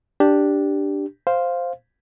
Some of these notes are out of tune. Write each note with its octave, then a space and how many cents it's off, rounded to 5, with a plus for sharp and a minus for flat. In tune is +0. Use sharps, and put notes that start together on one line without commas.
D4 +0 G4 +0
C5 +0 F5 +0